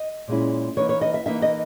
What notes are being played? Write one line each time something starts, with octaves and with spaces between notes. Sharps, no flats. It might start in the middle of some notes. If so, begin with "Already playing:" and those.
Already playing: D#5
A#2 G#3 C#4 E4
E3 A#3 D#4 C#5
C#5
D#5
E5
E3 A#3 D#4 E5
D#5